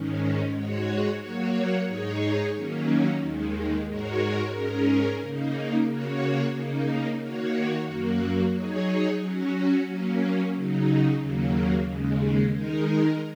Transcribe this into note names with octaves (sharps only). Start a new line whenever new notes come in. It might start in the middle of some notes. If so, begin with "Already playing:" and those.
Already playing: G#2 D#3 G#3 C#4
G#2 G#3 F#4 C#5
F#3 A#3 F#4 C#5
G#2 G#3 D#4 G#4 C#5
D#3 F#3 A#3 C#4
D#2 D#3 G#3
G#2 G#3 F#4 A#4 C#5
G#2 G#3 C#4 A#4
C#3 A#3 D#4
C#3 A#3 F#4 C#5
C#3 A#3 D#4
D#3 A#3 F#4 C#5
F#2 F#3 A#3 F#4
F#3 D#4 G#4 C#5
F#3 C#4 F#4
F#3 A#3 C#4
C#3 F#3 D#4
D#2 C#3 F#3 A#3
D#2 C#3 G#3
D#3 G#3 D#4 A#4